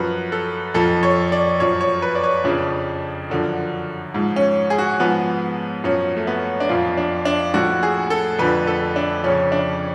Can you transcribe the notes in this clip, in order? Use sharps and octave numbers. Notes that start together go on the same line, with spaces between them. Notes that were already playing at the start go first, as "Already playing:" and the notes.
Already playing: F#2 F3 B4
A4
F2 F3 A4
C#5
D5
F#2 F3 C#5
C#5
B4
D5
C#5
F2 C#3 F3 D4
F#2 D3 F3
G#2 F3
C#4
G#4
F#4
G#2 F3 B3
F#2 F3 C#4
A3
B3
D4
F2 F3 F4
D4
D4
A2 F3 F#4
G#4
A4
F2 D3 F3 B4
A4
D4
F2 C#3 F3 C#4
D4